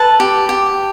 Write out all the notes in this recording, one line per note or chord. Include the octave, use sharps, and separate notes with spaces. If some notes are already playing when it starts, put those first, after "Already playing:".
Already playing: A4 B4 A5
G4
G4